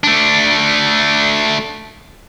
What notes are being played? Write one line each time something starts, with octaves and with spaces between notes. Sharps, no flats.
A3 D4